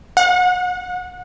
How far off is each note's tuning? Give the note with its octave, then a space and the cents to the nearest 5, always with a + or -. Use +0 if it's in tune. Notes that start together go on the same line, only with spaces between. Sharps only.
F#5 -30